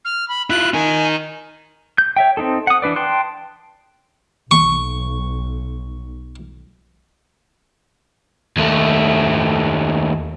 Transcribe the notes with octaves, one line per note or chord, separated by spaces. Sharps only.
F6
B5
E4 F4 F#6
D#4 A#4 G#5
G6
C#5 E5 G5
C4 D4 D#4 A4
F#5 D#6
E3 D4 B4 D5
G5 A5 C6 F#6
B1 C#6
D#2 A3